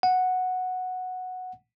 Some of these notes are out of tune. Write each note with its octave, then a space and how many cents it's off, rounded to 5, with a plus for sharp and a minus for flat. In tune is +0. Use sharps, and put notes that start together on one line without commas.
F#5 -5